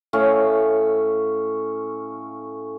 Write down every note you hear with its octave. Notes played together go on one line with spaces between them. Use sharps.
A2 C#4 F5